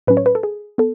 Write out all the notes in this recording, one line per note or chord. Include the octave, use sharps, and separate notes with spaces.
A2 F#3 C#4 B4
C#5
B4
A4
G#4
B3 A4